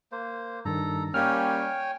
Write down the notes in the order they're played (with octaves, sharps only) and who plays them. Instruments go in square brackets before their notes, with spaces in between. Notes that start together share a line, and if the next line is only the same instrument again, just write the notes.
[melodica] A#3 C5
[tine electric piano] G2 D#3 [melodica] A4 A#5
[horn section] G3 A#3 C#4 [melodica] C#5 G5 G#5 [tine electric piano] F6